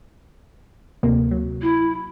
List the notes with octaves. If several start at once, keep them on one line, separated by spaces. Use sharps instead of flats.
D2 C3 A#3
F#3
E4